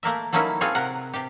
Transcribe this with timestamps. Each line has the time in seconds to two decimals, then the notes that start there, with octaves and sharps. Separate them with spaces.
0.03 A3 A#3 A#4 E5
0.33 F#3 A3 A#3 C#4 D#4 E4
0.61 C4 F4 G#4 A4 C#5
0.75 C3 A#4 F#5
1.14 C3 G4